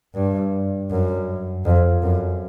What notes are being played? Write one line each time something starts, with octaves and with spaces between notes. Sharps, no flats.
G2
F#2
F2
F#2